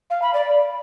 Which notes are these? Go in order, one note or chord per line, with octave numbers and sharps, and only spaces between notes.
F5
B5
D5